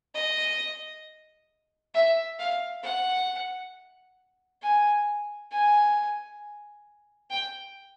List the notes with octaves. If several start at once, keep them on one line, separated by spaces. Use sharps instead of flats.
D#5
E5
F5
F#5
G#5
G#5
G5